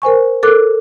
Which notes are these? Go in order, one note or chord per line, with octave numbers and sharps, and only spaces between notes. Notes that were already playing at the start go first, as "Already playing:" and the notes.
A#4 C5 G#5 C#6
A4 A#4 D6 F#6